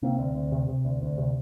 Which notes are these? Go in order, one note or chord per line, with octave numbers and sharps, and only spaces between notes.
C3 A#3 C4
D2
D2
C3
C3
D2
D2
C3